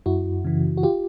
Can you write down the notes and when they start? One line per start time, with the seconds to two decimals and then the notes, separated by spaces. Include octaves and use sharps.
0.06 F#2 E4 F#4
0.45 C#3 E3
0.78 F#4
0.83 F4 G4